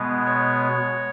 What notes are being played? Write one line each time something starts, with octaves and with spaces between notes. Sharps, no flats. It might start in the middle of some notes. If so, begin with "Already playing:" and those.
Already playing: B2 G#3 B3
C#5